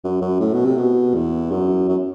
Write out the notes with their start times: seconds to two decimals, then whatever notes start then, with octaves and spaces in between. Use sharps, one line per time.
0.04 F#2
0.21 F#2
0.40 A2
0.53 B2
0.65 C3
0.78 B2
1.15 E2
1.51 F#2
1.88 F#2